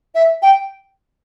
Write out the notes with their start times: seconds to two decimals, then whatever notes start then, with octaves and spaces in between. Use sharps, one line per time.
0.14 E5
0.42 G5